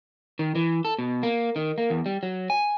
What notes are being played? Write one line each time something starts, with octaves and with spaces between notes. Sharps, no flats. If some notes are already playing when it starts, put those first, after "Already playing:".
D#3
E3
A4
B2
A#3
D#3
A#3
E2
G3
F#3
G#5